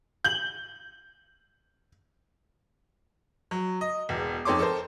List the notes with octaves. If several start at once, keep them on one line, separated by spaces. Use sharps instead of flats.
G6 F#7
F#3
D#5
E1 E2
F2 D#4 A4 C#5 C6 D6
A4 A#4 C5